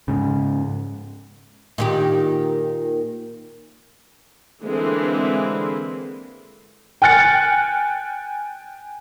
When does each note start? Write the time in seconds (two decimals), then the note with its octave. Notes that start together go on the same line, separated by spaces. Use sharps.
0.08 G#2 C#3
1.78 A#2 D#3 G4
4.64 D3 E3 G#3 A#3 C4 E4
7.02 G5 G#5 F6 F#6 A6 C#7